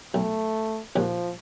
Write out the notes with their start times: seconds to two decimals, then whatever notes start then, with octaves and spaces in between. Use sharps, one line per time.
0.14 B1 A3
0.96 A#1 D#2 F3